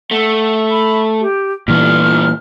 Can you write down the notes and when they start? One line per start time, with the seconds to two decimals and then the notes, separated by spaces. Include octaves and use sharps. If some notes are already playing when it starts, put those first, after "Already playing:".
0.11 A3 F#5
0.71 B5
1.21 G4
1.68 G2 A#2 E3 B3 F6